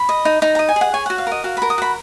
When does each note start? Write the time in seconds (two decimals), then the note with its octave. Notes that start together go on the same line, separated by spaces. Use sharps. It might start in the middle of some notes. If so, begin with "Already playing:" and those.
Already playing: B5
0.09 D#5
0.25 D#4
0.42 D#4 A#5
0.55 D#5 A#5
0.69 G#5
0.76 G#4
0.81 F#5
0.93 C#5 G#5
1.06 F#4 F#5
1.18 F5
1.27 A#4 D#5
1.44 F#4 F5
1.57 A#4 B5
1.70 D#6
1.78 F#4 B5